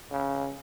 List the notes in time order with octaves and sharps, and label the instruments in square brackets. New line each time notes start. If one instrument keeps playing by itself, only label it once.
[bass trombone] C#3